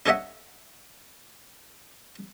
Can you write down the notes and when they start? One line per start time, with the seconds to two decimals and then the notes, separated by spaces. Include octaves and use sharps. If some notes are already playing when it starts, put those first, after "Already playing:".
0.06 D4 A4 C#5 D#5 E5 F#5